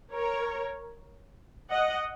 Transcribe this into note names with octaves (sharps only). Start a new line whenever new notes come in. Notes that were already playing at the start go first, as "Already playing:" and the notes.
A#4 C#5
D#5 F#5